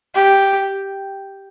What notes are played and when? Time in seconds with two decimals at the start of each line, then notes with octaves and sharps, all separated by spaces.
0.15 G4